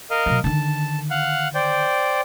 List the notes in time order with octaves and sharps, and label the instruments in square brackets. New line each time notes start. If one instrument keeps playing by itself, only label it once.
[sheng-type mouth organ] A#4 D#5 F5
[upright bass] B2 F#3
[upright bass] D3 D#3 [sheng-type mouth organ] A5
[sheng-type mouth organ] F5 F#5
C5 D5 G5